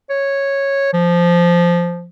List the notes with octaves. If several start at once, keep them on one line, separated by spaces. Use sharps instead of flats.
C#5
F3